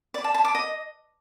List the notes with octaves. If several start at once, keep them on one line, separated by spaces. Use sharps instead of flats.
D5
A5
A5
D6
D#5